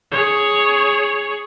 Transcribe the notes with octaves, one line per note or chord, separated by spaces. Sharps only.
G#4 C#5